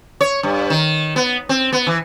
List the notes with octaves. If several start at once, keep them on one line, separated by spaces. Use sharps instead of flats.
C#5
G2
D#3
B3
C4
B3
E3